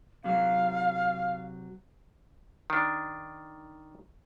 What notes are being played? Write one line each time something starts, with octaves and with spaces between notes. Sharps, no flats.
C3 F#3 F5
D#3 D4